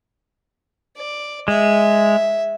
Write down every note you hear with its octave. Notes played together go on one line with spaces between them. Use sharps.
D5
G#3 E5